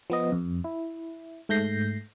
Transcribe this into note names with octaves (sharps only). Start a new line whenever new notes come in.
F3 B3 D#5
F2
E4
G#2 A3 G6 A#6 C7